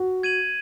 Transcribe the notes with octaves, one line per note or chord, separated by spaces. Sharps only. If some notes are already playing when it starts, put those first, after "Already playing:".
Already playing: F#4
G#6 D#7 F#7